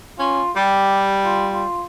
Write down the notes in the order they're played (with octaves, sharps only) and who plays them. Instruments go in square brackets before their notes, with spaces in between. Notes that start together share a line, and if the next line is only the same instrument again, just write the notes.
[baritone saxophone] C#4 [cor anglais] F4
[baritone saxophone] G3 [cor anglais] G4
[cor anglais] F4
F4